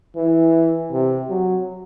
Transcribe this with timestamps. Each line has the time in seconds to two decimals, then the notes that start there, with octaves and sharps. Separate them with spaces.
0.16 E3
0.92 C3
1.30 F#3